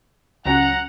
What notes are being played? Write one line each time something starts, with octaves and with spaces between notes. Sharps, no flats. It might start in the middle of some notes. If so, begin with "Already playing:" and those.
C#2 F#3 C#4 F#5 A#5